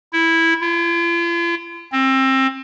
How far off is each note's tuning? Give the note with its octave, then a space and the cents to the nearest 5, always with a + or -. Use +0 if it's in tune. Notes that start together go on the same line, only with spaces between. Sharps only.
E4 -5
F4 -45
C4 +25